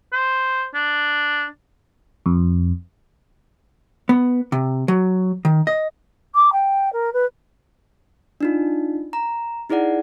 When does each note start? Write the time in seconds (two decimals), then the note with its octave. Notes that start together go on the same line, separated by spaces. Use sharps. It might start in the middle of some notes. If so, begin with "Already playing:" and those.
0.13 C5
0.75 D4
2.26 F2
4.09 B3
4.52 C3
4.88 F#3
5.45 D#3
5.67 D#5
6.35 D6
6.53 G5
6.93 A#4
7.13 B4
8.41 D4 D#4 F4
9.13 A#5
9.69 D#4 E4 G#4 D5 F#5